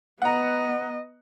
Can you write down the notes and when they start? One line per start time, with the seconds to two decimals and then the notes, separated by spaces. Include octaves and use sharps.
0.22 B3 D#5 F#5 A#5